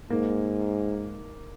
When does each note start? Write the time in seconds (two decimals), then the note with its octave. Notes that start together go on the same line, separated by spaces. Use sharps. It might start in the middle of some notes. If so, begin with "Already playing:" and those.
0.10 G#2 A#3